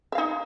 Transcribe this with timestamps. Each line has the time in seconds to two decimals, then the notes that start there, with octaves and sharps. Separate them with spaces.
0.12 E5
0.15 F5
0.18 D#4